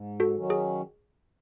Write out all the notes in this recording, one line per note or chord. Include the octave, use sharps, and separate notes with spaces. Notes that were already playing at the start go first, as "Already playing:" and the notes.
Already playing: G#2
F#4 A4
D#3 F#3 C#4
G#4